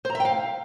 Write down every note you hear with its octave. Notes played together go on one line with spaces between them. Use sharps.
C5
A#5
E5
G5
F5